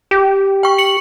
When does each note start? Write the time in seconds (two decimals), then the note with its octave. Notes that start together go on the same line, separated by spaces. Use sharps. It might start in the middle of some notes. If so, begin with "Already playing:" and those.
0.11 G4
0.63 G5 C#6
0.78 C#7 F#7